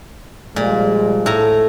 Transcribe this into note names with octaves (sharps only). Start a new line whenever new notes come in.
A#2 F3 G3 G#3
A2 A#5